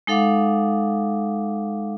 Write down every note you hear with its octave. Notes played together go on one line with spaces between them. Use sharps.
G#3 D#4 A4 F5 F#5 D6